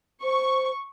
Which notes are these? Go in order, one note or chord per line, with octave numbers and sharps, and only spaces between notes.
C5 C#6